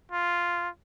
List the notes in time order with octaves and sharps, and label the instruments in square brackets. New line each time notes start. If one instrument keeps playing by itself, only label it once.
[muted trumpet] F4